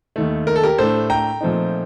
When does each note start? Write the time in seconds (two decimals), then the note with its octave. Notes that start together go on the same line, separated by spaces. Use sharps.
0.16 D#2 D#3 A3
0.47 A#4
0.56 A4
0.64 G4 A#4
0.78 A2 A3 D4 A4 C5
1.10 G5 A#5
1.41 A#2 F3 A3 C4 D#4